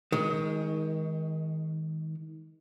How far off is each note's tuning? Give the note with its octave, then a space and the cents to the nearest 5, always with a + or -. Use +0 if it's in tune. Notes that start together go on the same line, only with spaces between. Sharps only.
D#3 +30 G#3 +0